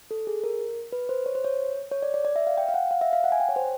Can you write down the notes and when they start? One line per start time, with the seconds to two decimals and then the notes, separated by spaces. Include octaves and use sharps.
0.11 A4
0.27 G#4
0.44 A#4
0.92 B4
1.09 C5
1.26 C#5
1.35 C5
1.44 C#5
1.92 C#5
2.03 D5
2.14 D5
2.25 D5
2.36 E5
2.47 F5
2.58 G5
2.69 F5
2.74 F#5
2.91 F5
3.01 E5
3.13 F5
3.24 F#5
3.32 G#5
3.40 G5
3.49 C#5
3.56 C5